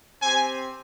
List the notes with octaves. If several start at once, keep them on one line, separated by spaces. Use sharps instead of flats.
C4 G4 G#5